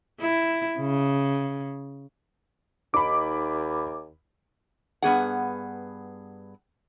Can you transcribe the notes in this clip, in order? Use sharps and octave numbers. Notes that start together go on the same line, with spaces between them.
E4
C#3
D#2 D#4 B5 D6
G2 B3 G#4 F#5